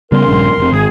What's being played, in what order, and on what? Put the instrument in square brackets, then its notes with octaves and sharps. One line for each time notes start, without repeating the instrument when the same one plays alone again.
[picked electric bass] C#3 G3 B3 [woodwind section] A#4 C6
[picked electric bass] A#1 G2 C#3
F1 C3
[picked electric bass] G#1 [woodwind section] G#4